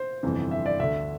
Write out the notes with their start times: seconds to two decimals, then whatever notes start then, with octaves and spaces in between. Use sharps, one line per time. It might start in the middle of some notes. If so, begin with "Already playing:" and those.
Already playing: C5
0.23 G1 F2 C3 E3
0.51 E5
0.66 D5
0.80 D2 D3 E5